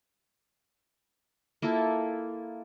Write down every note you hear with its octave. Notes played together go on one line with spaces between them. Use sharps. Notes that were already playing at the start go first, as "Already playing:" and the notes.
A#3 E4 F4 A4